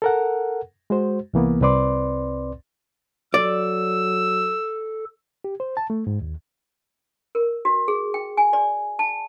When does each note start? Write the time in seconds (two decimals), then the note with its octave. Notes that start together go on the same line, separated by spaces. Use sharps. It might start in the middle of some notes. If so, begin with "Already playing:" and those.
0.02 A4 A#4 F#5
0.90 G#3 F#4 C5
1.34 C2 E3 A#3 B3
1.62 C2 C4 B4 D5 C6 D6
3.34 F#3 A4 D5 E6
5.44 G4
5.60 C5
5.77 A5
5.90 A3
6.07 G#2
6.21 D#2
7.35 A#4
7.65 F#4
7.88 G#4
8.14 G5
8.37 G#5
8.53 D5
8.99 A5